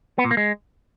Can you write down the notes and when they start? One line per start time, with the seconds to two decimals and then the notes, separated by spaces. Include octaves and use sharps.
0.18 B3
0.25 A#2
0.31 A#3
0.37 G#3